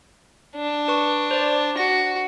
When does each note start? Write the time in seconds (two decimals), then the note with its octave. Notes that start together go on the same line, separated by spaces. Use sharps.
0.56 D4
0.88 B4 C#6
1.31 C5 D5
1.77 F#4 A#6